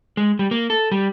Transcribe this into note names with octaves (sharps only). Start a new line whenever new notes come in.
G#3
G3
A#3
A4
G3